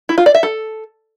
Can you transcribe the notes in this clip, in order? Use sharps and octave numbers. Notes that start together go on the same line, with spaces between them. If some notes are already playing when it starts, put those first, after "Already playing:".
E4
F4
D5
E5
A4